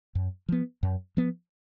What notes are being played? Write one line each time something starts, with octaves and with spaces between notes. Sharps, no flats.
F#2
F3 B3
F#2
F3 B3